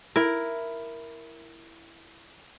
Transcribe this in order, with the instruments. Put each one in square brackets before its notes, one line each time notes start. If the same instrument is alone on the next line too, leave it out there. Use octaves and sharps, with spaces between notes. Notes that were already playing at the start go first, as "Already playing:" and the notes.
[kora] E4 [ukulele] A#4